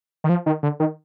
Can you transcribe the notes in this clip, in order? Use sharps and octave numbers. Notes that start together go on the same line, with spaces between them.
D#3
F3
D#3
D3
D#3